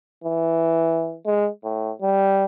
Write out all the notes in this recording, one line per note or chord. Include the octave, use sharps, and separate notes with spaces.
E3
G#3
A2
G3